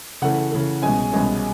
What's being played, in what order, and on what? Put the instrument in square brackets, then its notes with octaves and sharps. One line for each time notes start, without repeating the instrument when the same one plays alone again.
[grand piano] C#3 E3 A3 F#5
C#3 E3 A3
C2 B2 G#3 C#4 G#5
C2 B2 G#3 C#4